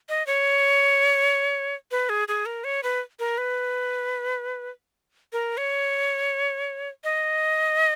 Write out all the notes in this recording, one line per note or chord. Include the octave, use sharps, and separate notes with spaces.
D#5
C#5
B4
G#4
G#4
A#4
C#5
B4
A#4
B4
A#4
C#5
D#5